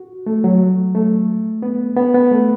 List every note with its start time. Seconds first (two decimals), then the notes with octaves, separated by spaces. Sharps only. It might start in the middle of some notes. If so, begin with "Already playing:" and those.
Already playing: F#4
0.26 A3
0.44 F#3
0.95 A3
1.62 B3
1.97 B3
2.14 B3
2.31 A3